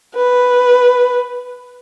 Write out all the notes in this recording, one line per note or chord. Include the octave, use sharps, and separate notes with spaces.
B4